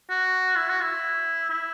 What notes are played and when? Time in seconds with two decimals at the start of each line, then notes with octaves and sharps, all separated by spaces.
0.10 F#4
0.56 E4
0.69 F#4
0.82 E4
1.50 E4